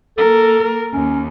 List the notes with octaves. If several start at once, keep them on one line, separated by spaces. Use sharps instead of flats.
A#3 A4 A#4
D#2 C#4